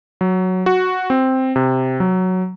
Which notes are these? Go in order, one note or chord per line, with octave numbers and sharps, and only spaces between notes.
F#3
F#4
C4
C3
F#3